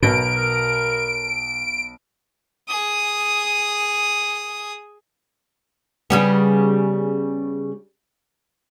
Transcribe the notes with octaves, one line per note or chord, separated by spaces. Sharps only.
B1 B2 B3 A#4 D7
G#4 D#6
C#3 G3 B3